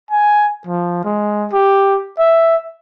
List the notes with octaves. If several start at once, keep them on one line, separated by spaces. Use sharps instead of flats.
G#5
F3
G#3
G4
E5